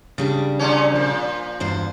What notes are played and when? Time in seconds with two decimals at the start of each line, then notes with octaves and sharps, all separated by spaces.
0.18 C#3 G3 D4
0.59 A#2 D3 C#4
0.91 A#2 F3
1.60 E2 G2 C5